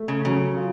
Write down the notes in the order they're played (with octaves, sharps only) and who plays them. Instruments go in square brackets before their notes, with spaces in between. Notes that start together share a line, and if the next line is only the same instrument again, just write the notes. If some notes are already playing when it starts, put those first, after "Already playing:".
Already playing: [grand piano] A3
[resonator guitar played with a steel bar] C#3
[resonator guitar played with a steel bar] C#3 [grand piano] F#3
[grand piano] F4